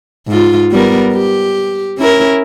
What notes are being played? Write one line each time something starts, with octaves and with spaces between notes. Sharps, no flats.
G#2 F4
G3 B3 A#4
G4
C#4 E4 A#4